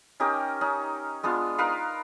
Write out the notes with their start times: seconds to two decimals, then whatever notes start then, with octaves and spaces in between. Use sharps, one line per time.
0.20 C#4 D#4 G4 A#4
0.61 C#4 D#4
1.23 G#3 B3 D4 F4
1.58 D#4 A#4 B4 F5